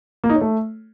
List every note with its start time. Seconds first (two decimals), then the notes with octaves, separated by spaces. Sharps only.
0.24 A#3
0.29 D#4
0.35 C#5
0.41 A3